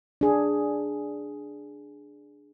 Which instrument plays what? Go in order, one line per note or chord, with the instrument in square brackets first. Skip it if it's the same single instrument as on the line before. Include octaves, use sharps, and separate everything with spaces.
[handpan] D4 G#4